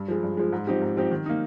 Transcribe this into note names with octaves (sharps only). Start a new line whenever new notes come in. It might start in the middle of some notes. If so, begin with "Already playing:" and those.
Already playing: G2
F3 G#3
G2
F3 G#3
G#2
F3 C4 D#4 G4
G#2
F3 C4 D#4 G4
D#3
A#3 D#4